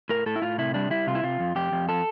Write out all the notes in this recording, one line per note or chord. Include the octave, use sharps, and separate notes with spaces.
A2 A#4
A2 A4
E4
A2 F4
C3 E4
G3 D4
G3 E4
C3 F4
E4
C3 F4
F2
F2 G4
F2
F3 A4